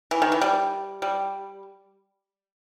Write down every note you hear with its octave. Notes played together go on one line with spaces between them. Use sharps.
E3
D#3
E3
G3
G3